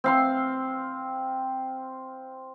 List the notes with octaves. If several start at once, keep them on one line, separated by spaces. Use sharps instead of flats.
C4 F5 C6